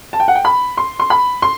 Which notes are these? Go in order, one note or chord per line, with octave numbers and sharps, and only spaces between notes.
A5
G5
F#5
G5
B5
C6
C6
B5
C6